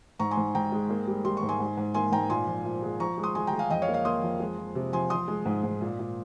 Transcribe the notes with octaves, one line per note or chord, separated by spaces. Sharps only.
G#2 A#5 C#6
G#5 C6
G#2
G#2 G5 A#5
G#3
A#3
G3
G3 C6
C#6
G#2
G#5 C6
G#2
G#2
A#3 G#5 C6
G#2 G5 A#5
A#2 G#5 C6
F3
A#2
G#3
F3 A#5 C#6
G#3
C6 D#6
G#3 G#5 C6
G5 A#5
G#3
F5 G#5
F2 D#5 G5
C#5 F5
A#3
C#5 F5
A#3 C6 D#6
F2
G#3
F3
C3
F3 G#5 C6
F3 C6 D#6
G#3
G#2
G#2
A#2
A#2